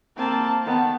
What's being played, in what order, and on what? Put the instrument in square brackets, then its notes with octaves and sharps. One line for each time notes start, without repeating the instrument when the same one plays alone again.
[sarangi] A#3 [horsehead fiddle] C4 A5
[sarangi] D#3 [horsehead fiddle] B3 A5